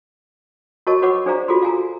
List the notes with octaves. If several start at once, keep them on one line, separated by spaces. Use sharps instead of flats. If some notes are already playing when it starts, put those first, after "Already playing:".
F#4 A#4 C#5 D#5 A5 C#6
F#4 B4 C#5 F#5 C#6 D6
D4 G#4 C5 D5 F5 A#5
F4 F#4 G#4 A4 C6
F5 G#5 A#5